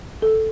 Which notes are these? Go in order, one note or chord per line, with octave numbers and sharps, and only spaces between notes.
A4